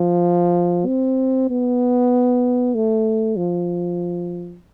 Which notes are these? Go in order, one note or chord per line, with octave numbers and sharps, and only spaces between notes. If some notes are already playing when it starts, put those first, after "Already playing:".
Already playing: F3
C4
B3
A3
F3